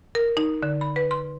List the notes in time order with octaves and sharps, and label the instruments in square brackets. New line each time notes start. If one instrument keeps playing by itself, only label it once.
[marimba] A#4
D#4
D3
B5
B4
C6